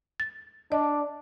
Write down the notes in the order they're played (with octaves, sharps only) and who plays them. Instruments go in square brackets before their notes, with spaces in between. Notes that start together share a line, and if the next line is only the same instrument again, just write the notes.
[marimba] A6
[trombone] D4 [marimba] D5 D#5